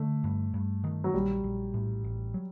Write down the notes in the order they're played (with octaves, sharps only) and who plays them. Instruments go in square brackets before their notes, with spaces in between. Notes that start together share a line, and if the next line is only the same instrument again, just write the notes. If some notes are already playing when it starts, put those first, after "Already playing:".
Already playing: [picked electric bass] D3 [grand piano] A3
[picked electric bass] G2
G2
D#3
[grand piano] F#3
[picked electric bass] A#1 [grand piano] G3
[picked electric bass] A#1
A2
A1
F#3